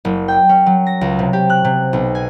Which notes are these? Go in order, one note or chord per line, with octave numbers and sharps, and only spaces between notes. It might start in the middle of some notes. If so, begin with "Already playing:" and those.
F#1
G5
C#4
F#3
A#6
C#2
C3
G4
F#6
C3
B1
G#5